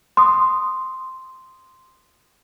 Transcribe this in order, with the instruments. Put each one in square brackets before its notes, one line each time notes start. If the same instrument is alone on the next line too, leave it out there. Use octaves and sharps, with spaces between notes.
[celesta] C6 D#6